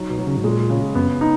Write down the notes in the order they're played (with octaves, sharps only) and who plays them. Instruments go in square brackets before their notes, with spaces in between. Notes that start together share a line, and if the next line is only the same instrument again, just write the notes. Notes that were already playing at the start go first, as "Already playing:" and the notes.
Already playing: [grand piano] F#3 D#4
[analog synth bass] B2
[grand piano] F#3
[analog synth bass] C#3
G#2
[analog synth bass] A#2 [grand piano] G#3
[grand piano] C#3
[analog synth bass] F#2 [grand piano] B3
[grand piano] D#4